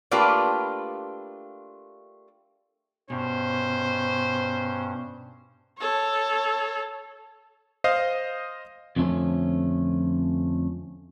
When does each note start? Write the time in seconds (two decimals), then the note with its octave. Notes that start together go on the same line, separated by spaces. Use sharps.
0.11 A3 A#3 D4 F4 G4 B4
3.10 G2 B2 C#4 C5
5.78 A4 C#5
7.84 C5 D#5 F5
8.96 F2 D3 F3 A3 C#4